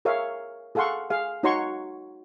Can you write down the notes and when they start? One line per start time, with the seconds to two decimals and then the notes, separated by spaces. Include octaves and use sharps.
0.05 G#4 A#4 C#5 E5 F5
0.75 G#4 A4 F5 F#5 C6 C#6
1.10 G#4 F5
1.43 D#4 F#4 C#5 A#5 C6 C#6